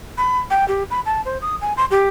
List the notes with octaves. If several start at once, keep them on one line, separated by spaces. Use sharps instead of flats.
B5
G5
G4
B5
A5
C5
D#6
G#5
C6
G4